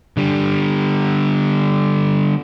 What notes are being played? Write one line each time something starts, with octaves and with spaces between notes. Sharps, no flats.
D3 G3